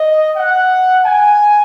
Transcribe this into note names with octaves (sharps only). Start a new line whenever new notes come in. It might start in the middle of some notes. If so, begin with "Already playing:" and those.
Already playing: D#5
F#5
G#5